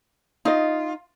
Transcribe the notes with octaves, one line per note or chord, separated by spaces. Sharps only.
D#4 F4 D#5